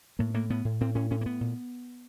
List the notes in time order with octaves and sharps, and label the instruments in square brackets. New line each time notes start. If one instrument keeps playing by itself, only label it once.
[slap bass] A2 A#3
A2 A#3
A2 B3
A2
A2 C4
A2 C#4
A2 C#4
A#3
A2 B3
A#2